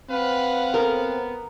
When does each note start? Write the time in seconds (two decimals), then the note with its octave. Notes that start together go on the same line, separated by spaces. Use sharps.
0.10 C4 B4 F5 F#5
0.74 B3 A#4